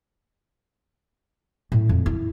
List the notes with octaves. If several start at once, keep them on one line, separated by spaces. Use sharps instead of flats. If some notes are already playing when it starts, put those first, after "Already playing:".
A2
F2
E4